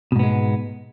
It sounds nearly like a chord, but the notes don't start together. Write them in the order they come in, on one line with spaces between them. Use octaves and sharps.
B2 G#2 B3 G#3